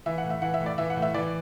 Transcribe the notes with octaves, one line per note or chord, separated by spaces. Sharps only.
E3 E5
F#5
A2
E5
E3 F#5
E5
A2
D5
E3 E5
F#5
A2
E5
E3 D5